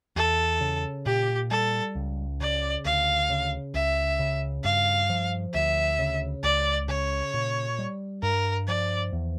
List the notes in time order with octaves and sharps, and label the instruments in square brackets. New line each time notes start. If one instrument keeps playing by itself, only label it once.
[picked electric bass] E2 [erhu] A4
[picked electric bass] C#3
[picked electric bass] A#2 [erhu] G4
[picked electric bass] G3 [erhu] A4
[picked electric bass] C#2
[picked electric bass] C#3 [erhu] D5
[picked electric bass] D2 [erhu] F5
[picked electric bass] C#3
[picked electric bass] C#2 [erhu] E5
[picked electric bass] C#3
[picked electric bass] G2 [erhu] F5
[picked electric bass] F3
[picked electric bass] D2 [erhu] E5
[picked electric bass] C#3
[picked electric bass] C#2 [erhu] D5
[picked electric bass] C#3 [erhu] C#5
[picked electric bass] A#2
G3
[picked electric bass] G2 [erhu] A#4
[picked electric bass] F3 [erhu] D5
[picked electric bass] E2